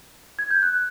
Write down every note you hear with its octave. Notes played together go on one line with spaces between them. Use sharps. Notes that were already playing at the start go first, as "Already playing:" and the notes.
G#6
G6
F#6